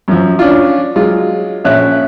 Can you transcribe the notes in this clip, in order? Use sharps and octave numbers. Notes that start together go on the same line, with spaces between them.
F#2 F3
C#4 D4 F4
F#3 G#3 F4
A#1 C#4 E5 F#6